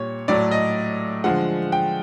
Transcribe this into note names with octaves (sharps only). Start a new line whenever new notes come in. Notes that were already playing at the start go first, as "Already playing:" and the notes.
Already playing: A#2 G3 C#5
A2 F#3 A3 D5
D#5
D3 F3 G#3 F#5
G5